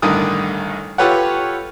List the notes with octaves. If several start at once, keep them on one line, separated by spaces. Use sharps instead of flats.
A1 G2 D3 D#3 D#6
F4 G4 A4 B4 C#5 F#5